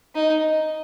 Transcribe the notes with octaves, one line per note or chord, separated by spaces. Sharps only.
D#4